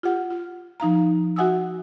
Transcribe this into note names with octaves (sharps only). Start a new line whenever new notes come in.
F4 G4 F#5
F4
F3 D#4 F5 A#5
F#4 E5 F#5 G#5 D#6 E6